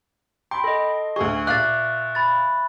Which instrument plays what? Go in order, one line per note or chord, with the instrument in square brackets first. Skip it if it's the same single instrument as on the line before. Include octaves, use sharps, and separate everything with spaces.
[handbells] G5 B5 [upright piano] C6
[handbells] A4 D#5
[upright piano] D2 G#4 [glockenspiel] C#6
[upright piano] A#2 D6 [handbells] E5 F5 [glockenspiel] F#6 A6
[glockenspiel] B5 A6